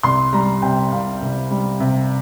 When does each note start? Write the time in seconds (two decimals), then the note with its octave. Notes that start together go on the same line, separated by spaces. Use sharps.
0.03 C2 C6
0.33 G3 A#5
0.62 C3 G5
0.92 C2 F5
1.22 C2
1.51 G3
1.80 C3